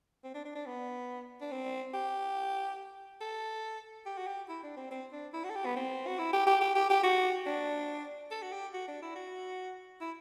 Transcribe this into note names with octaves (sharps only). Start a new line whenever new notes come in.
C4
D4
D4
D4
B3
D4
C4
G4
A4
G4
F#4
G4
E4
D4
C4
C4
D4
E4
F#4
A4
G4
B3
C4
F#4
E4
G4
G4
G4
G4
G4
F#4
D4
A4
F#4
G4
F#4
D4
E4
F#4
E4